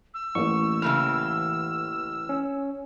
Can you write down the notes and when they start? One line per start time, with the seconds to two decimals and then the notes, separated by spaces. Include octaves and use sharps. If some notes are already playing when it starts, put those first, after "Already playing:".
0.14 E6
0.35 A1 A#3 C#6
0.82 A2 C#3 E3 F6
2.29 C#4